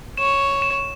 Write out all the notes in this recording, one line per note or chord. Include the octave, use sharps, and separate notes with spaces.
C#5 E7
E7